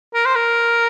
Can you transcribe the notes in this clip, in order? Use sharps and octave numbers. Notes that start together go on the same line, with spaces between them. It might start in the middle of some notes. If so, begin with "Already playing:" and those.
A#4
C5
A#4